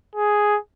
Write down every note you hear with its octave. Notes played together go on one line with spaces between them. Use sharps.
G#4